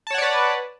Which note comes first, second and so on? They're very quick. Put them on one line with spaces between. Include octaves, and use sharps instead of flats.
A5 C#5 F#5 D5 B4